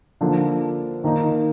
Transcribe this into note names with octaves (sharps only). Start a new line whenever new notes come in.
D3 F3 A#3 D4
D#3 A#3 D#4